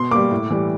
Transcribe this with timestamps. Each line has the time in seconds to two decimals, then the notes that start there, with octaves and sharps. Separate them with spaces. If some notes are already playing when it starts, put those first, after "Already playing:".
Already playing: B2 C6
0.11 G3 A#3 D6
0.31 A2
0.50 E3 G3